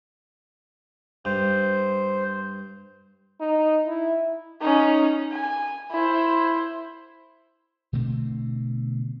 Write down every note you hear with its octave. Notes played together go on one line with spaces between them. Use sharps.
G2 C5
D#4
E4
C#4 D#4
G#5
E4 C5
B2 D3 A3 C4